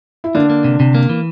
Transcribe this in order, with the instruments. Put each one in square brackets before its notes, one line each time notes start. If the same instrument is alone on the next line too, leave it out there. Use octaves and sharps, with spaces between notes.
[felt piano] E4
[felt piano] D3 D4 [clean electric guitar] A#3
[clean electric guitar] A#3
C3
C3
A#3
E3